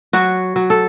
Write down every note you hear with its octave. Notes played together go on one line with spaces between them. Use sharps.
F#3 F#4
F#3
A4